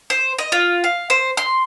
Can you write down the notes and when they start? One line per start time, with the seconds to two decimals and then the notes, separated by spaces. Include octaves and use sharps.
0.10 C5
0.39 D#5
0.52 F4
0.84 F5
1.10 C5
1.37 C6